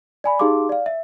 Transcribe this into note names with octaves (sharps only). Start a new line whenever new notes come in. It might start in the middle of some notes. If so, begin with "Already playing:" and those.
D5 G#5 B5
D#4 G4 G#4 F5 C6 D6
D5 F5
E5